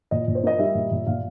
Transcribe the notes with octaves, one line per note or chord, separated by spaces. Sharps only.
A#2 D#5
A#2
C5
A#3 D#5
G3 E5
A#2
A#2
A#2 F5